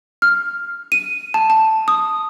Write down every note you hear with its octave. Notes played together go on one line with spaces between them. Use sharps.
F6
D#7
A5
A5
D#6